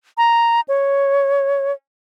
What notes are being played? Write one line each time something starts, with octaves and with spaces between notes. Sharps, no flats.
A#5
C#5